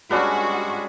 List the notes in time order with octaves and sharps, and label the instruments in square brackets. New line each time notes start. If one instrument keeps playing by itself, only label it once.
[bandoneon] G3 G#3 G#4 [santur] C#4 D4 B4 [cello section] F#4